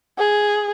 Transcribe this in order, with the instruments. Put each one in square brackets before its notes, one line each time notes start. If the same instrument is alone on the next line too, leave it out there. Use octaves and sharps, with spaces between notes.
[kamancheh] G#4